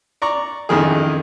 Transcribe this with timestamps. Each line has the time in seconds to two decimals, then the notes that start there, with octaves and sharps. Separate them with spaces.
0.22 D5 A#5 C#6
0.69 A1 F2 D#3 G#4